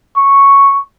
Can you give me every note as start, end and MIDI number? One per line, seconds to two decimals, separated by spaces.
0.17 0.80 85